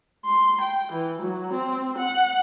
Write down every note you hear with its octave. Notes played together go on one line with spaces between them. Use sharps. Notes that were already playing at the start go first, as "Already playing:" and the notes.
C6
G5
E3
F#3
C4
F#5